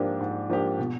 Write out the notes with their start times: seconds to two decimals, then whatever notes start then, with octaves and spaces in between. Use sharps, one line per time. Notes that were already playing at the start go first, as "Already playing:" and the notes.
Already playing: G#2 F3 A#3 D4 G4
0.20 G#2
0.50 F3 A#3 D4 G4
0.79 B2